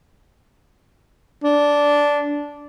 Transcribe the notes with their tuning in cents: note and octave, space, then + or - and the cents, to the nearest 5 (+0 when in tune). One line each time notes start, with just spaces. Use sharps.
D4 -10